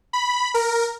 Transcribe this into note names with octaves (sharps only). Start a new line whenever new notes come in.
B5
A#4